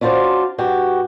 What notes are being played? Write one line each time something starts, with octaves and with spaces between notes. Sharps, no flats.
C#4 D4 F4 F#4 C5 D5
G2 F#4 G4